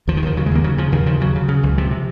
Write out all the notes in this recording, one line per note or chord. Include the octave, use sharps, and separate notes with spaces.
D#2 F3
D#3
D#2 F3
C#3 F#3
G#3
D#2 A#3
C#3 F#3
C#3 F3
D#2 D#3
C#3 F3
C#3 F#3
C#3
C#3
C#2
C3 F3
C3